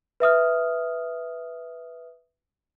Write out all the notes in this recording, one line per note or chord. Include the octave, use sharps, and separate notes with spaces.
B4 E5 D#6 F6